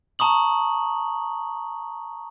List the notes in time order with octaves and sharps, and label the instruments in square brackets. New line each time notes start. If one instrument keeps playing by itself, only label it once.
[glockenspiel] A5 A#5 C#6 D#6 F#7